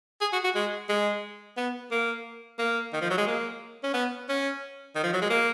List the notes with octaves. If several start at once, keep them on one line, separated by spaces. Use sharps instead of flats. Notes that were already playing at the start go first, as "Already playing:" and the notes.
G#4
F#4
F#4
G#3
G#3
B3
A#3
A#3
D#3
F3
F#3
G#3
A#3
C#4
B3
C#4
D#3
F3
F#3
G#3
A#3